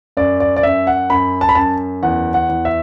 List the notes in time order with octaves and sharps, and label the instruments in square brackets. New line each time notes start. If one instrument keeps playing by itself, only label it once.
[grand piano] F#2 D5
D5
D5
F#2 E5
F#5
F#2 B5
A5
B5
F#2 A5
E2 F#5
F#5
E2
E5